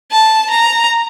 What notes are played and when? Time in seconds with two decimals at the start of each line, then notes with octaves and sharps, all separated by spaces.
0.11 A5
0.51 A#5